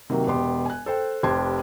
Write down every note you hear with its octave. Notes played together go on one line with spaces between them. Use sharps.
C3 D#3 F#3 A#3
E1 B3 G4 C6
G#5 F#6
A4 C5 G5
F1 G4 C5 A5 C6 G#6